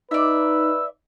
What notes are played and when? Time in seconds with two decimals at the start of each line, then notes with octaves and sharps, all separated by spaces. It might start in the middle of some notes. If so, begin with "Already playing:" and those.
0.11 D#4 B4 D5 E5 E6